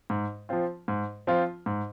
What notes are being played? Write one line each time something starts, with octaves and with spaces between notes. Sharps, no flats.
G#2
F3 C4 F4
G#2
F3 C4 F4
G#2